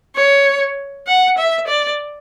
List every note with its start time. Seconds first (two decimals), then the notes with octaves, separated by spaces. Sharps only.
0.16 C#5
1.07 F#5
1.38 E5
1.67 D5